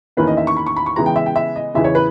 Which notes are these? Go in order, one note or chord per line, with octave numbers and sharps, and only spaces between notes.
E2 D#3 A#3 C#4 E4 B4
D#5
E5
C#6
B5
C#6
B5
C#6
C#3 E3 G#3 B3 A#5
G5
E5
G5
E5
D#5
E2 C#3 E3 E5
C#5
B4